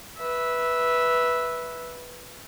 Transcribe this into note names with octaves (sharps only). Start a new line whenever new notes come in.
B4 E5